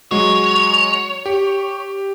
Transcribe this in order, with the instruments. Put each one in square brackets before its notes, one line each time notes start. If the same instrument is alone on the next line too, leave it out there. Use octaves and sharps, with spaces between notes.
[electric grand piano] F#3 G#3 F#4 [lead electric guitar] C#5
[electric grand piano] G4